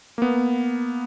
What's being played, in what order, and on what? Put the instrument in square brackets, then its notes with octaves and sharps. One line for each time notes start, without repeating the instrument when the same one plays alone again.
[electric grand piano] A#3 B3